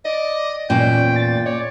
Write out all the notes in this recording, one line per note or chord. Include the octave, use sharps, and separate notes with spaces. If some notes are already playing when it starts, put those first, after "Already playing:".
D5 D#5
E2 A#2 C#4 G5
A6
C#5 D5